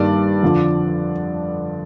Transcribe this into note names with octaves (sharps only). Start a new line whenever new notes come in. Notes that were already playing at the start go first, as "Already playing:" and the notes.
Already playing: G2 D#3 G3 A#3 D5
F2 D3 F3